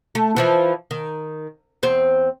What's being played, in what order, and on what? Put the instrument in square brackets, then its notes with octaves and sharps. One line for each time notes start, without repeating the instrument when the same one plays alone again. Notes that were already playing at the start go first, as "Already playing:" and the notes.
[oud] A3
E3 F3 E4
D#3
E2 C4